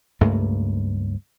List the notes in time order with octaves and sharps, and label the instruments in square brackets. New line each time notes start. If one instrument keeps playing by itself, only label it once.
[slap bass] C#2 G2 A3 A#3